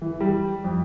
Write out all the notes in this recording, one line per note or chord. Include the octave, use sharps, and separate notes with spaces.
E3
G3
F2